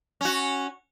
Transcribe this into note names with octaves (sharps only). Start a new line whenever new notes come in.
C#4 F#4